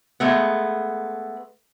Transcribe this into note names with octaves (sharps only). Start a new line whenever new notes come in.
G#3 A3 B3